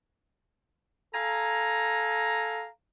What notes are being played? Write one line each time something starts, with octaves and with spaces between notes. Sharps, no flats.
A4 F5 G#5 A#5